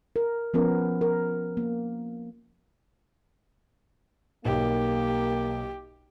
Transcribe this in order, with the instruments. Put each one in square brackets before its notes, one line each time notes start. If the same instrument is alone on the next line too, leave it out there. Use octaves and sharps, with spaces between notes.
[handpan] A#4
F3 B3 C#4 A#4
A#4
A#3
[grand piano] B1 [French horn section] A#3 [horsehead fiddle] G4